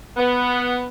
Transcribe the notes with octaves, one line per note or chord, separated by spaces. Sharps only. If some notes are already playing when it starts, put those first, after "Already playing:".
B3